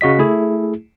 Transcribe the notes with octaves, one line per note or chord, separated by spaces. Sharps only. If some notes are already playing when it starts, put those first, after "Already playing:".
C#3 F#4 D#5 B6
A3 E4 G#4